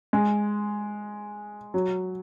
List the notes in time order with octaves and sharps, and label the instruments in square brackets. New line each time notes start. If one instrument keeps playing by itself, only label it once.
[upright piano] G#3
F#3